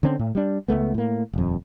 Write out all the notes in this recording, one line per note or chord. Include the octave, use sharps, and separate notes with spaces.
D3 C4 C#4
A2
G3 D4
C#2 G#2 A3 B3
A2 A#3
D#1 F2